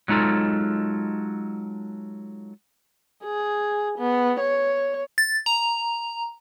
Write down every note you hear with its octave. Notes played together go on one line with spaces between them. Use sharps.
F#3 G#3 D#4 F4 A4
G#4
B3
C#5
A6
A#5